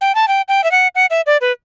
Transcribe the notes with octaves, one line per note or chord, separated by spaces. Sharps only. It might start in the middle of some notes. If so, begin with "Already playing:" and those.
G5
A5
G5
G5
E5
F#5
F#5
E5
D5
B4